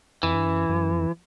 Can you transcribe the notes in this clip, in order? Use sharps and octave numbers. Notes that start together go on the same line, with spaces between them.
F2 E3
G2
F#2
F#2
F2